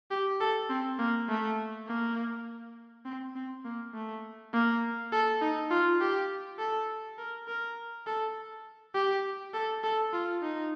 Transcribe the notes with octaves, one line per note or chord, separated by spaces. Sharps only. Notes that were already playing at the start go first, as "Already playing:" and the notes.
G4
A4
C4
A#3
A3
A#3
C4
C4
A#3
A3
A#3
A4
D#4
F4
G4
A4
A#4
A#4
A4
G4
A4
A4
F4
D#4